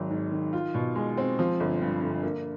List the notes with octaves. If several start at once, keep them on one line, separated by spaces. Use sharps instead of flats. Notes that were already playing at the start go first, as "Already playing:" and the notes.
Already playing: G#1 F#3
G#2
D#3
F4
B2
G#3
C4
F3
G1
G2
D3
A#3